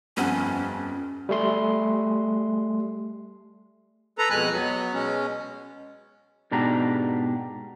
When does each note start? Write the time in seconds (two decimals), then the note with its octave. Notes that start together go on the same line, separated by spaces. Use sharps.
0.17 G1 F2 C#4 F#5
1.29 G3 A3 C6
4.18 A4 B4 A#5
4.30 F2 B2 G#3 G#5 F#6
4.52 F#3 B3
4.93 B2 G#3 C#4
6.51 G#2 B2 D4 G4 A#5